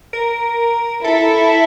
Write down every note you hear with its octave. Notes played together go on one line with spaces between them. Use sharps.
A#4
E4 A4